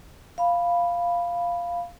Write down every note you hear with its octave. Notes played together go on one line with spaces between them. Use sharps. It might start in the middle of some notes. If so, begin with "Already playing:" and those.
F5 B5